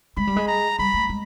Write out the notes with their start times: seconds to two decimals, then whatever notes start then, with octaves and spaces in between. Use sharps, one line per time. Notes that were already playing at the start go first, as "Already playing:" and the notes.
0.17 G#3 B5
0.27 G3
0.36 G#3
0.48 A#5
0.79 G3 B5
0.94 A3
1.09 G#3